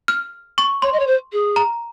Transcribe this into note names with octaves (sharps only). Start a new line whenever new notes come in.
F6
C#6
C#5 C6
D#5
C#5
C5
G#4
A#5